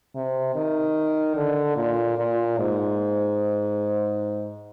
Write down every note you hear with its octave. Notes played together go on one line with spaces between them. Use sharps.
C3
D#3
D3
A#2
A#2
G#2